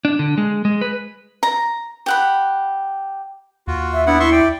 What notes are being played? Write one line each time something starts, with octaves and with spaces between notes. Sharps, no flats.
D4
D3
G#3
G#3
B4
A#5
G4 F#5 B5
D#2 F4 F#4
E5
B3 D4 E4 F#5
E4 E5 C6 C#6
D5 G5